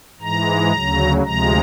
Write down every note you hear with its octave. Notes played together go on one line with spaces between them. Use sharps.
G#2 E3 G#3 A#5
D2 C#3 F#3
D2 C3 F3 G#3 A#5